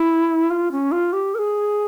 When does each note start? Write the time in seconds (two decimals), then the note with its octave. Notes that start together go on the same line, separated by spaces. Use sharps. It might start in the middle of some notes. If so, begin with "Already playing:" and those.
Already playing: E4
0.50 F4
0.72 C#4
0.92 F4
1.13 G4
1.35 A#4
1.39 G#4